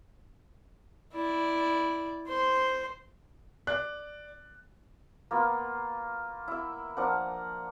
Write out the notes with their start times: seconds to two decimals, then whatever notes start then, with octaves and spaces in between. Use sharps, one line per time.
1.13 E4 D5
2.28 C5 C6
3.67 D5 F#6
5.31 A#3 B3 F4
6.48 E4 E5
6.97 F3 D4 A#4 F#5